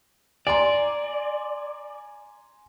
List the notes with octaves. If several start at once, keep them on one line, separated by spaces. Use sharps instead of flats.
D5 G#5 A#5 C6